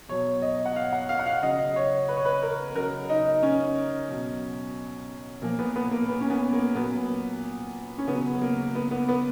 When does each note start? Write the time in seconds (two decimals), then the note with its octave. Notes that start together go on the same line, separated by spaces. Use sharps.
0.09 B2 F#3 C#5
0.42 D#5
0.65 F#5
0.76 F5
0.93 F#5
1.09 F5
1.19 F#5
1.26 F5
1.42 C#3 F#3 D#5
1.76 C#5
2.08 B4
2.17 C#5
2.25 B4
2.42 A#4
2.75 C#3 F#3 A#4
3.09 D#4
3.43 C#4
4.08 B2 F#3
5.42 A#2 F3 A#3
5.59 B3
5.76 B3
5.91 A#3
6.08 B3
6.21 C#4
6.30 B3
6.53 A#3
6.75 A#2 F#3 B3
7.98 C#4
8.07 C#3 F#3 B3
8.42 A#3
8.75 B3
8.91 B3
9.08 B3